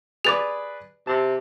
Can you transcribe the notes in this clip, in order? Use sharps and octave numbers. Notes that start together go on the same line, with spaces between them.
G#4 B4 D5 D6 A6 F7
C3 A5